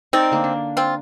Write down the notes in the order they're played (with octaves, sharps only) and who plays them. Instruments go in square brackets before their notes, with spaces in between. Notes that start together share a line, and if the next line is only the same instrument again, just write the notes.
[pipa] C4 [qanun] D#4 A#4 D5
[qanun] D3 A#3
D4
[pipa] C4 F4